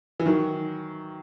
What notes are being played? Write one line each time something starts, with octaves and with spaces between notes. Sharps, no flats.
E3
D#3 F#3